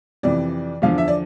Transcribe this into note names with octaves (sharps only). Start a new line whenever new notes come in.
F2 C3 E3 D5
E2 D3 F3 F5
E5
D5